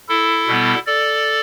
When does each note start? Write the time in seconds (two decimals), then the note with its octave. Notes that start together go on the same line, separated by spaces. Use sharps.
0.09 E4 A4
0.47 B2 G3 B3
0.86 A4 D5